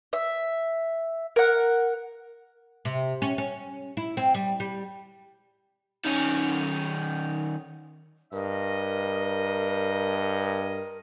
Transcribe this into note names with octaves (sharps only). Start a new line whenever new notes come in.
E5
A#4 F#5
C3
C#4
C#4
E4
C4
G3
G3
D#3 C#4
G2 A#4 D#5